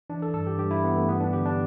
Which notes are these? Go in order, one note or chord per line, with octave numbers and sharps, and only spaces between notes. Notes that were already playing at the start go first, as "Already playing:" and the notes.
E3 D4
A4
G2 A4
G4
G2 G4
E4
E3 B3
A3
G2 B3
D4
D3 G4
D4